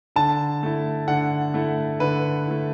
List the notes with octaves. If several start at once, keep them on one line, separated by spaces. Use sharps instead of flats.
D3 A5
A3 E4
D3 F#5
A3 E4
D3 B4
A3 E4